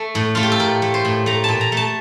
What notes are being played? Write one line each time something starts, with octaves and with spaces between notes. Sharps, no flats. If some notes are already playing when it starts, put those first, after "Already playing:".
Already playing: A3
A2
A3 F4
G4
A4
A2 A#4
A3
C5
A2
A3 A#5
A#2 A5
A#5
A3 A5